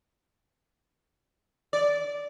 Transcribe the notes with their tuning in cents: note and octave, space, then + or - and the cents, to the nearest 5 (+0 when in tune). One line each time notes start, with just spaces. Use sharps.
D5 -20